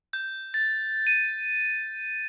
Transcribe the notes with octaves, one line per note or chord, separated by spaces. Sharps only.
G6
A6
D#7